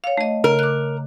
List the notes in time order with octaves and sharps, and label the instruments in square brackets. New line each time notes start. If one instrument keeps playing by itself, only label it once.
[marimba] C#5 F5
A3 D#5
[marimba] C#3 [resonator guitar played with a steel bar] A#4
[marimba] D6 F#6